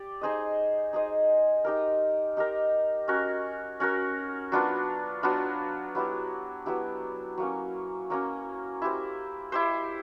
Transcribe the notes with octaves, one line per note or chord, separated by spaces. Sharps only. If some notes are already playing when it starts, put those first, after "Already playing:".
Already playing: G4 D5
D#4 G#4 C5 D#5
D#4 G#4 C5 D#5
D#4 G4 A#4
D#4 G4 A#4
C#4 F#4 A#4
C#4 F#4 A#4
F#3 B3 D4 F4
F#3 B3 D4 F4
F#3 B3 E4 G4
F#3 B3 E4 G4
F#3 A#3 C#4
F#3 A#3 C#4
E4 G4 C5
E4 G4 C5